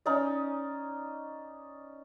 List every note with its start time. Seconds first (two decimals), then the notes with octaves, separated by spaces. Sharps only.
0.06 C#4 D#4 D5